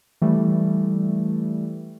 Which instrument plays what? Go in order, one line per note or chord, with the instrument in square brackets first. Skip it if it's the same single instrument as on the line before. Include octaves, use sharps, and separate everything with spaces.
[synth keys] E3 G3 A3